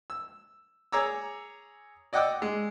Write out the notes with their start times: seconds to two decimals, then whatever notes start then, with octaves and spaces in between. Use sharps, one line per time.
0.10 E6
0.92 G#4 C#5 A#5 D6 E6
2.13 D5 D#5 F#5 G5 D6 E6
2.42 G#3